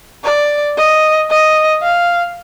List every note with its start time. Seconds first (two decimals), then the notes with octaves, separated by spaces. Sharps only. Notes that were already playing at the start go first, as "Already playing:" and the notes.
0.24 D5
0.77 D#5
1.30 D#5
1.82 F5